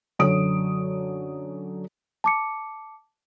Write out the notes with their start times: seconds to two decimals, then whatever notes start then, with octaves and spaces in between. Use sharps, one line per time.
0.19 F#2 D3 C#5 D#6 D7
2.24 A5 D6 C#7